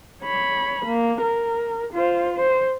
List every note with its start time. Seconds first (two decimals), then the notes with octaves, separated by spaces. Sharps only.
0.22 C#5 B5
0.85 A#3
1.22 A#4
1.93 F4 C5
2.37 C5